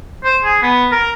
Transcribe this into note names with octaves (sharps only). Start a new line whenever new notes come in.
C5
G#4
B3
A#4